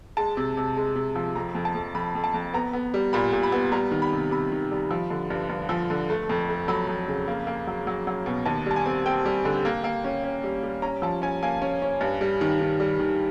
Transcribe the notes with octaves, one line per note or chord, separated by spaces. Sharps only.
G#3 A5
C3
C3
G#3
C3
F3
F2 A#5
F2
A5
F2
F2 B5
F2
A5
F2
B3 A#5
B3
G3
A#2 B5
A#2
B5
B3
G3 A#5
D#3
B5
C3
C3 B5
D#3
G3
F3
D3
G2
G2
F3
D3
A3
F2
A3
F#3 B5
F2
C#3
A#3
A#3
F#3
F#3
F#3
B2
D#2 A5
G3 A5
G#5
C4
C4 G5
G3
D3
A#3
A#3
C#4
C#4
G3
G3
C#4 A#5
F3 A5
C#4 G#5
A#3 G#5
C#4
C#4
G2
G3
D#3
D#3
G3
D#3